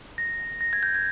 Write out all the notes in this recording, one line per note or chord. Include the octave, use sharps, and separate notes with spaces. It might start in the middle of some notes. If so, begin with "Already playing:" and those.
A#6
A#6
G#6
G6
G#6